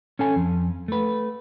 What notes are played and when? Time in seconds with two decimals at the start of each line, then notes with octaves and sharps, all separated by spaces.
0.19 C#4 A4 G#5
0.36 F2
0.88 A3 B4